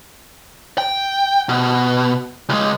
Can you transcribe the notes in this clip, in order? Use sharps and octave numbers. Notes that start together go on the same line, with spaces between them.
G5
B2
C#2 G#3